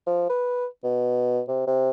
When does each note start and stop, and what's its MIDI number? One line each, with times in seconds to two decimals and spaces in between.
0.07 0.27 53
0.30 0.66 71
0.84 1.41 47
1.48 1.66 48
1.67 1.91 48